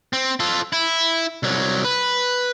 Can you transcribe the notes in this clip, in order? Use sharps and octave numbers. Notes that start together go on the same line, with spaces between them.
C4
F4 A4
E4
C2 F#3
B4